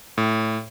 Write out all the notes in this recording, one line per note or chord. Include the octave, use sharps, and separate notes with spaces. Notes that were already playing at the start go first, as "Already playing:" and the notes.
A2